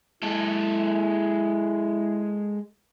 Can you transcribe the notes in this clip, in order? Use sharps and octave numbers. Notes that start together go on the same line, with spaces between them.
G#3 E4 A4